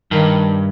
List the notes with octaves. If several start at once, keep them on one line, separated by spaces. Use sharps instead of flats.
G2 D#3